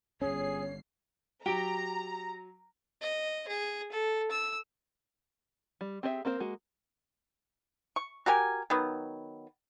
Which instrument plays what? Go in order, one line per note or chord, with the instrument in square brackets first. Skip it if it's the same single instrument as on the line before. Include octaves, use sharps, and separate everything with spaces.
[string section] G1 C7 [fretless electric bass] C#4 [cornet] G#4 [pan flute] C#5
[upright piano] F#3 D7 G7 [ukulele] G4 [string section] A#5
[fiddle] D#5
G#4
A4
E6
[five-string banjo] G3
C4 G4 G#4 D#5 E5
A#3 C4 A#4 C5
G#3 A#3 F#4
[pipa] C#6
F#4 G4 A#4 G#5
D#3 F#3 B3